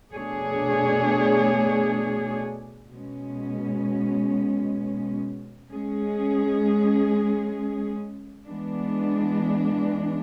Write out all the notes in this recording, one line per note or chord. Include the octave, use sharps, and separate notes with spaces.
B2 A3 D4 G#4 C#5
B2 G#3 C#4
G#3 C#4 G#4
E3 G#3 B3 D4